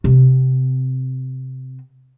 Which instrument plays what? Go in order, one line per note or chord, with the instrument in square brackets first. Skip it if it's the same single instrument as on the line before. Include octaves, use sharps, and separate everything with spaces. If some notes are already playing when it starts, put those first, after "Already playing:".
[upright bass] C3 C4